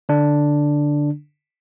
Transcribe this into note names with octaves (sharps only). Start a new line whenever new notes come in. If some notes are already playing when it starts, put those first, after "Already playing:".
D3 D4